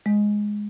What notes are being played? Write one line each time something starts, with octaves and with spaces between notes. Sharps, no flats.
G#3